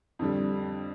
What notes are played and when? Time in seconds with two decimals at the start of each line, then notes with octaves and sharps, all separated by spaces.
0.19 F2 D3 G3